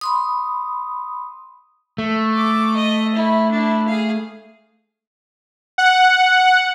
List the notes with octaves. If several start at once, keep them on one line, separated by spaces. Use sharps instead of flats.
B5 C6 D#6
A3
D6
D#5
E4
D4 E4
G#4 F5
F#5